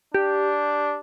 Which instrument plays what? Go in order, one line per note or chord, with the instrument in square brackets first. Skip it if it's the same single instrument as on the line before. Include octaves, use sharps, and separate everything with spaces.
[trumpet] D4 [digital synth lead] G4